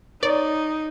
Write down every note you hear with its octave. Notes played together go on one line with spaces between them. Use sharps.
D#4 C#5 D5